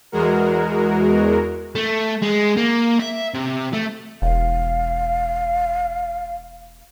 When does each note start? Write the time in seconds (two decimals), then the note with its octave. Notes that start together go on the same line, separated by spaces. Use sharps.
0.12 E2 G#3 F#4 A#4
1.75 A3
2.22 G#3
2.57 A#3
3.00 E5
3.34 C3
3.73 A3
4.22 E1 F5